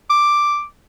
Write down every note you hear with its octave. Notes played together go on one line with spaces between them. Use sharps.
D6